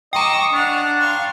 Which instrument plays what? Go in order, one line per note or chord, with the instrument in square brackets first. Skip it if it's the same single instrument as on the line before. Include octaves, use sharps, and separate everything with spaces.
[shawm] D#5 [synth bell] G5 A#5 [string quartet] C#6 D6 E6
[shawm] D4 [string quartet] F#5 F6
[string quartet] F5 C6 C#6